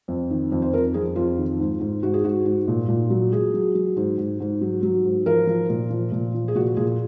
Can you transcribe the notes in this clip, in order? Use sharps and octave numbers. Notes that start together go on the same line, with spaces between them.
F2
D#3
F2
C5
F2 A#4
F2 G#4
F2 F4
D#3
G#2
G#2
G#2 F#4
G#4
G#2 F#4
G#2
A#2
A#2
F#3
F#3 G#4
F#3
F#3
G#2
G#2
G#2
F#3
F#3
G#2
F3 A#4
F3
A#2
F3
A#2
F3
G#4
A#2 F#4
A#2 G#4